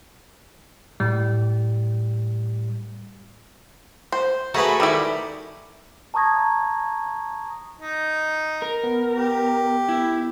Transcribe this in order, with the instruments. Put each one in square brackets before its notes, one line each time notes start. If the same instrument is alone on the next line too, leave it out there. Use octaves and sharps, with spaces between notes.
[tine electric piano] A2 G3
[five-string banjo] C5
[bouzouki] A3 [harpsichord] F#4 G#4 B4 [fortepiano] A#5 B5
[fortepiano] D#3 D6 [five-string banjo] G3 E4
[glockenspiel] A5 A#5 C#6 D#6 G#6 A#6
[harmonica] D#4
[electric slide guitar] A#4
[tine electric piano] B3
[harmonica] G4
[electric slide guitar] E4